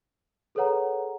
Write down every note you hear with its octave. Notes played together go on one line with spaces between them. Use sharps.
G#4 A4 B4 C#5 F#5 A#5